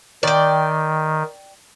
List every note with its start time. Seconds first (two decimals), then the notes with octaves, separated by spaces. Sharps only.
0.23 D#3 D5 G5